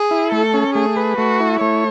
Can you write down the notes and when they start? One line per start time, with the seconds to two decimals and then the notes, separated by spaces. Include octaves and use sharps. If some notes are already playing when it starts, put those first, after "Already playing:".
Already playing: G#4
0.11 E4
0.32 A3 A4
0.54 C#4
0.75 A3 G#4
0.96 B4
1.18 A3 F#4
1.40 E4
1.60 A3 C#5